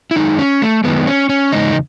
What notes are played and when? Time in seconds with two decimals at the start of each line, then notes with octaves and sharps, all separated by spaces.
0.11 E4
0.16 F#2 D#3 G#3 D#4
0.39 C#4
0.62 A3
0.84 F#2 D#3 G#3 B3
1.07 C#4
1.29 C#4
1.52 E2 C#3 G#3 D#4